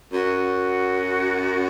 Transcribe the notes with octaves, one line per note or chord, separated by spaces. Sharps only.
F#2 F#4